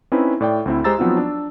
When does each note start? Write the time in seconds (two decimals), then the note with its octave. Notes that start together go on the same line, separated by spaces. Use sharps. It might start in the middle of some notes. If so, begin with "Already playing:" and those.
0.12 C4 C#4 D#4 E4 B4
0.41 A2 D5 G5
0.66 D2 C4 E4
0.84 G#3 G4 C5 A#5 E6 A6
0.98 F3 F#3 B3 C4 D#4 F4
1.17 D4